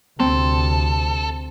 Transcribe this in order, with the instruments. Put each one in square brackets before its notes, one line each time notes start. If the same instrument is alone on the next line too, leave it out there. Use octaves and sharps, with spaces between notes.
[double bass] D2 C3 [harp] C4 [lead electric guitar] A4